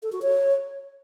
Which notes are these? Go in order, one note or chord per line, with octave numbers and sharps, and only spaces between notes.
A4
F#4
C#5